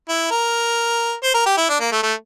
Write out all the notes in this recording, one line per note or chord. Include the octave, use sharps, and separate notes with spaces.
E4
A#4
C5
A#4
G4
E4
D4
A#3
A3
A3